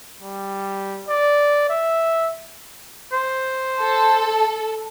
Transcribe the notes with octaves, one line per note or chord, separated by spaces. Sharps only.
G3
D5
E5
C5
A4